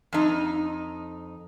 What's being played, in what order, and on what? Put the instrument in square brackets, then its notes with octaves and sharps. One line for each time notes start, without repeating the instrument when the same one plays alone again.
[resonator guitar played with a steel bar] F2 D#4